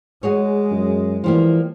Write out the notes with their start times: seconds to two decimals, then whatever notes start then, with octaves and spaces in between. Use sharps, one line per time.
0.23 G#3 F#4 G#4 C#5
0.71 F#2
1.24 E3 F3 G3 A#3